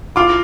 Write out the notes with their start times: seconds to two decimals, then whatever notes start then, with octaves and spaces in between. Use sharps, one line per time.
0.16 F4 D6